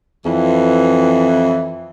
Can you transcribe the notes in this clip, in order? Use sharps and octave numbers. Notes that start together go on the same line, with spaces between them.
F2 E3